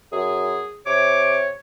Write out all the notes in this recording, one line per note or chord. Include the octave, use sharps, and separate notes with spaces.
F#2 G#4
C3 C#5 D6